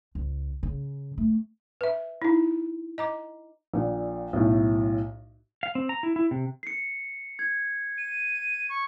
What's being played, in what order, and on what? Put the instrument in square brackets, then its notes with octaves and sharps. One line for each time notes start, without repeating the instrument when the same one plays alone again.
[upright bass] C#2
C#3
A3
[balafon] B4 E5
D#4 E4
D#5 A#5 D6
[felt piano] A#1 A#2
B1 A2
[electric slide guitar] F5
C4
A#5
E4
E4
C3
[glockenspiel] C7 C#7
G#6
[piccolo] D#7
C#6